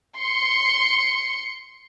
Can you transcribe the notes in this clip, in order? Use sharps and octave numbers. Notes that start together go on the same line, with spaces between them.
C6 C#7